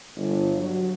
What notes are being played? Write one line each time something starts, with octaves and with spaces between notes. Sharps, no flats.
G1
F#3